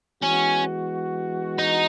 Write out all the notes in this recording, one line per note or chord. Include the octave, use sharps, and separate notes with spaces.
E3 G#3 B3 C#4 F#4
D#4